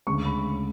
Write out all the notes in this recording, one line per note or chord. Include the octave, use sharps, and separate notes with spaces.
D2 C#3 G#3 C#4 C#6
B5